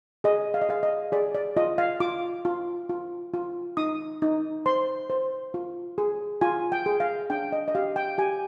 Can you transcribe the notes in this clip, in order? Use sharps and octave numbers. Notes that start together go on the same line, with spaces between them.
G#4 D#5
F5
D#5
G#4 F5
D#5
G#4 D5
D5
F4 D#5
F5
F4 D6
F4
F4
F4
D#4 D#6
D#4
C5 C6
C5
F4
G#4
F4 G#5
G5
G#4
F5
D4 G5
D#5
D#5
G4 F5
G5
G4 G#5